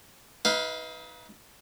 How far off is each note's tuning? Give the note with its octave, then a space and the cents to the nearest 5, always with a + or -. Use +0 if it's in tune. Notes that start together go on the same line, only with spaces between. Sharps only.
D#4 +35 B4 +0 F5 +0